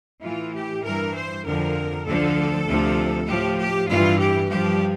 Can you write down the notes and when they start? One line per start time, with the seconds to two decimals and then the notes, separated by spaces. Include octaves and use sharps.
0.23 A2 E3 F4
0.54 G4
0.84 G2 E3 A#4
1.15 C5
1.45 F2 D3 F3 A#4
2.06 D2 D3 F3 A4
2.67 D2 C3 F3
3.28 A2 F3 G4
3.58 G4
3.89 G2 E3 F4
4.19 G4
4.49 G2 F3 G4